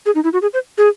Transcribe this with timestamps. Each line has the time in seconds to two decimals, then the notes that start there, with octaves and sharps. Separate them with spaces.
0.06 G#4
0.15 D#4
0.24 E4
0.33 F#4
0.42 G#4
0.53 C5
0.78 G#4